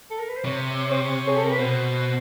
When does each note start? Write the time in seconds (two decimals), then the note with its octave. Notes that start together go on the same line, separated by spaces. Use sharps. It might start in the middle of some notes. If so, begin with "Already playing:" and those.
0.10 A4
0.19 A#4
0.28 B4
0.37 C5
0.45 C3 C#5
0.91 C5
1.02 C#5
1.28 G#4
1.37 A4
1.44 A#4
1.50 B4
1.58 B2 C5